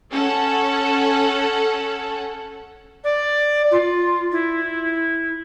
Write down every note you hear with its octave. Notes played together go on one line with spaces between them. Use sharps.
C#4 A4 F#5
D5
F4
E4